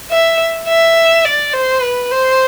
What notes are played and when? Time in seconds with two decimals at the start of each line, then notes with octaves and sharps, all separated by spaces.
0.11 E5
0.68 E5
1.25 D5
1.53 C5
1.82 B4
2.11 C5